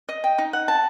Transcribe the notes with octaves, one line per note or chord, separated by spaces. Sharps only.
D#5
G5
D#4
F#5
A5